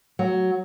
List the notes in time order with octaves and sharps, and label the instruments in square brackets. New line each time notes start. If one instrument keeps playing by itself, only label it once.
[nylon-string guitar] F#3